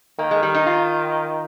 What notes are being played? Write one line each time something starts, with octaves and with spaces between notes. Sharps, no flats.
D#3 A#3
G#3
G3
D#4
F4